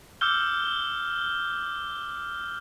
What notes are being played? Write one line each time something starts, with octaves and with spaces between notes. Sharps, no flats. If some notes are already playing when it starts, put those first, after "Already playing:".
D6 E6 F6 G6 G7